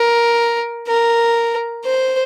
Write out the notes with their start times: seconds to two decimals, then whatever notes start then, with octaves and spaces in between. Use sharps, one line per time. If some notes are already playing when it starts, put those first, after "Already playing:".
Already playing: A#4
0.88 A#4
1.85 C5